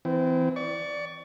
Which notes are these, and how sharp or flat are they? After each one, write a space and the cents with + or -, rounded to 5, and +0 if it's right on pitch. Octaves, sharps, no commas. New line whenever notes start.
E3 +0 C4 -25
D5 +0 C#6 +30